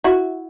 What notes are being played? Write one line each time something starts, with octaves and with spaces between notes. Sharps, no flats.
E4 F#4